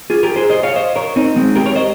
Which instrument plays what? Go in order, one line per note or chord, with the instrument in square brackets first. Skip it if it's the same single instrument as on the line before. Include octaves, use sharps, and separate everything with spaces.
[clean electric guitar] F4 G#4
G4 A#4
G#4 C5
C5 D#5
C#5 F5
C5 D#5
A#4 C#5
C4 D#4
G#3 C4
G4 A#4
A#4 C#5
C5 D#5